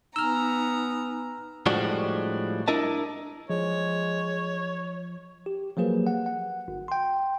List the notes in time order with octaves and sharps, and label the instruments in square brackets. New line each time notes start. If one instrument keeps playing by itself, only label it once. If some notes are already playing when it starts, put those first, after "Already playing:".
[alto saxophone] B3 [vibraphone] D#4 G#5 [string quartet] A#5 [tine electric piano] E6 F6
[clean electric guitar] A2 F3 G3 G#3 D4 F#4
D4 E4 A#4 D#5 A5
[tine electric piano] F3 [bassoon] G#3 [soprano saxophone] C#5
[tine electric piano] G4
F3 F#3 A#3 G#4 B4
F#5
F#5
G1
G5 C6